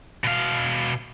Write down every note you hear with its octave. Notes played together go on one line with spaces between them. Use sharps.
B2 F5